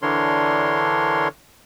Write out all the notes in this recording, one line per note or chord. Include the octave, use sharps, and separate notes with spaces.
D3 E3 D4 A#4 C#5 C6